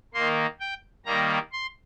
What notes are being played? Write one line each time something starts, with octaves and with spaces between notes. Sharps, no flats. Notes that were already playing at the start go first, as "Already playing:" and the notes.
D#3 A#3 C6
G5
D#3 G3 A#3 A#5
C6